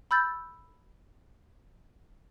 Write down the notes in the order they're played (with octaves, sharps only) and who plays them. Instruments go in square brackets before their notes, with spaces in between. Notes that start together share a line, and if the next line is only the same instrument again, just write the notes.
[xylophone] B5 E6 G6 A6